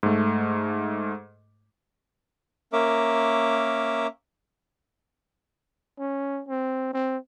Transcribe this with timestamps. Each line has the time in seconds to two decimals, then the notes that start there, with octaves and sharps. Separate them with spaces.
0.03 G#2 A3
2.73 A#3 C#4 A#4 E5 D6
5.99 C#4
6.48 C4
6.94 C4